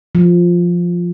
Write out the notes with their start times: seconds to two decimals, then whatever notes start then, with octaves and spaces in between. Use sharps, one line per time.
0.15 F3